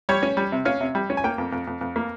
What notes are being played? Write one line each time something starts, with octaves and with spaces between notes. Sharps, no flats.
G3 C#5
C#4
G3
C3
C#4 F5
C3
G3
C#4
G#5
A#3 G5
F2
F2
F2
F2
A#3